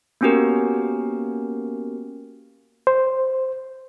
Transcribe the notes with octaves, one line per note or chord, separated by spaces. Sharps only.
A#3 B3 C#4 F#4 G4 A#4
C5